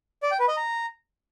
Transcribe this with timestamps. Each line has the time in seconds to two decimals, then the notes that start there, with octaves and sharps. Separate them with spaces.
0.23 D5
0.31 G5
0.40 B4
0.48 D#5
0.57 A#5